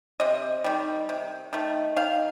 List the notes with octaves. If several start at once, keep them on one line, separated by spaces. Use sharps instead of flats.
C3 D#5
D#3 G3
C3
D#3 A3
D#3 F5